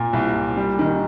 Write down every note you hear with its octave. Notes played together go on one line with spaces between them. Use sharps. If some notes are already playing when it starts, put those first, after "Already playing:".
Already playing: A#2
C2
A#2
G3
D#3